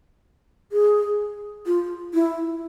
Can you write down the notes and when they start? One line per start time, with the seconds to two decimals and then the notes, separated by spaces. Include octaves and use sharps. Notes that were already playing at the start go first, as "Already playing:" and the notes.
0.72 G#4
1.67 F4
2.14 E4